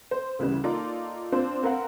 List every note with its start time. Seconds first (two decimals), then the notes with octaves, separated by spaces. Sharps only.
0.11 C5
0.39 D2 C#3 E3 G3
0.63 A#3 D#4 F4 A4 D5
1.32 C4 D4 F4 C5
1.63 C4 A#4 B4 F5 F#5